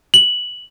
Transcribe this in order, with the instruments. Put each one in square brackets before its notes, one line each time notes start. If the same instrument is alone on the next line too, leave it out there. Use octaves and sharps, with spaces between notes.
[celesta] F#7